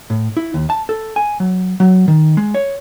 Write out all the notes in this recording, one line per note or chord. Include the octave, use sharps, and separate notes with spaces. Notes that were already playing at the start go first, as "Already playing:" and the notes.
A2
E4
D#2
A5
A4
G#5
F#3
F#3
D#3
G#3
C#5